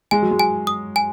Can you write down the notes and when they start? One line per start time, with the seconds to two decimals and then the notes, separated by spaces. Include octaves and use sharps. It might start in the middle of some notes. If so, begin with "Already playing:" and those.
0.11 G#3 G#5
0.22 F#3
0.31 G#3
0.39 G#5
0.67 D#6
0.96 G#5